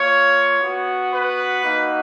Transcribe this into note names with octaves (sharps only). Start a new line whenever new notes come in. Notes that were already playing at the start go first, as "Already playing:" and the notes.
Already playing: A#3 F4 C#5
B3 F#4
B4
A#3 D#4 F#4